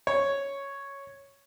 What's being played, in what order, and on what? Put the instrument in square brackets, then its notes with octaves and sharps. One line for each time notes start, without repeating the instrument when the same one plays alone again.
[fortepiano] C#5